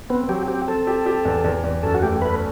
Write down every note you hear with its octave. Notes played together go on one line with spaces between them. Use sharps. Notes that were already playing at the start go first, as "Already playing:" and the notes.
B3 C4
F#3 G4
C4 G4
C4 A4
G4
G4
E2
E2
E2
F#2 A4
F#4
A3 G4
A3 B4